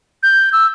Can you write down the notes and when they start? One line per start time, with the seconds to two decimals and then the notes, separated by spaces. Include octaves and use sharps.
0.23 G6
0.53 E6